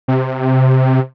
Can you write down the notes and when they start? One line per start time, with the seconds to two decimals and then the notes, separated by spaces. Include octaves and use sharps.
0.08 C3